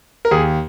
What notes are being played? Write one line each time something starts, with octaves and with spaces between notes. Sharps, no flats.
A#4
D#2 G#4